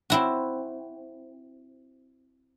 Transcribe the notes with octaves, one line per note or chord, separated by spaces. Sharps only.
C4 E4 F#4